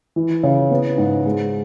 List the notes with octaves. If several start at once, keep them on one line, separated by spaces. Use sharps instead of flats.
E3
C#3
B3
G#2
G#3